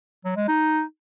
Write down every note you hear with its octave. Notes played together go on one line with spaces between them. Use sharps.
F#3
G#3
D#4